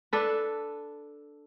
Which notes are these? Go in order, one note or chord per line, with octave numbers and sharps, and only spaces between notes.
D4 A4 B4